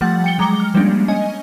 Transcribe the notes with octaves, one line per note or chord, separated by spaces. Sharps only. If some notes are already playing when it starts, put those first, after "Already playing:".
F3 G3 A3 F#5 A6
G5 C#7 G7
F#3 G#3 A#5 D6 C#7 G7
F6
F3 G3 G#3 A#3 C#4 D4
C#4 D#5 G#5